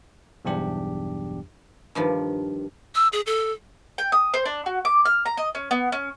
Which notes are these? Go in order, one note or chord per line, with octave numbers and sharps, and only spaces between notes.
B1 E2 G2 D4 G4
G2 D#3 F3
E6
G#4
A4
G5
D#6
C5
D4
F#4
D6
F6
A#5
D#5
C#4
B3
C#4